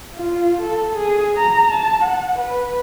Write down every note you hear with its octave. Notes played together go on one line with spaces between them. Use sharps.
F4
A4
G#4
A#5
A5
F#5
B4